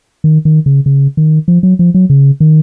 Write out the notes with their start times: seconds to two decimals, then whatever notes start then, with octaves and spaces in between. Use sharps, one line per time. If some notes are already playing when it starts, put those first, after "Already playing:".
0.24 D#3
0.45 D#3
0.66 C#3
0.86 C#3
1.17 D#3
1.48 F3
1.63 F#3
1.79 F3
1.94 F#3
2.10 C#3
2.40 D#3